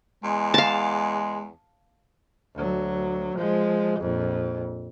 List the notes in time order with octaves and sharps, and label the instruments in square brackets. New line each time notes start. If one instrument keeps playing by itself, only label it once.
[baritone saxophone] E2 [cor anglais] G#3
[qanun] F5 A5
[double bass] D2 F#3
F3 G#3
A#1 F2